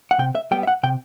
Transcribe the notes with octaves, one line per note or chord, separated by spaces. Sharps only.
F#5
C3 G5
E5
G3 B3 G5
E5
F#5
C3 G5